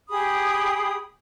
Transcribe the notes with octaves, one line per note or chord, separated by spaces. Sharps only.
G4 G#4 B5 D#6